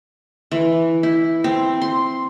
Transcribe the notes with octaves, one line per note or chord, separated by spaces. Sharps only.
E3
E4
C4
C6